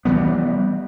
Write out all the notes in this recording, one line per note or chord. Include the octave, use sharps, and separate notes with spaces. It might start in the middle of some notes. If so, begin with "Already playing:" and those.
E3 F#3 G3 B3